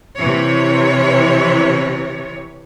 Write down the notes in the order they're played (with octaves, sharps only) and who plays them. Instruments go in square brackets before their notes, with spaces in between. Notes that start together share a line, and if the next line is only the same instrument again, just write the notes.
[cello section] C3 E3 C#5